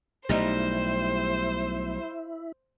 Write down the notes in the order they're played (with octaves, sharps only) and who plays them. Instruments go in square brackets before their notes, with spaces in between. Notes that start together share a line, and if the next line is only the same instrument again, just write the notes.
[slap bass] B1 A3 [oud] G3 D#4 [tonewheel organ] E4 [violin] C5